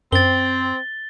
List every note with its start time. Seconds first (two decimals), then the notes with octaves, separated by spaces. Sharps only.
0.12 F#2 C4 A6 G7